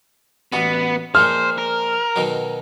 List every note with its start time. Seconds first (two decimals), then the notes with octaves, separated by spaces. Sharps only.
0.52 A1 B3 F#4
1.15 A#2 F3 G#3 C5 F6
1.58 A#4
2.16 B2 D#3 F#3